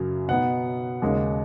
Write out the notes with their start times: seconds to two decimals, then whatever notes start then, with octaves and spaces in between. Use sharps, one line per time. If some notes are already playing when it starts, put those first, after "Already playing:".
Already playing: F#2 C#3 F#3
0.28 B2 B3 D#4 F#5
1.02 D#2 C#3 G#3